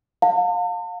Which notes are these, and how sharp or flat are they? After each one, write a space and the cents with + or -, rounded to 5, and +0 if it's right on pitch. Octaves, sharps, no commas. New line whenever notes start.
F5 +30 A5 +40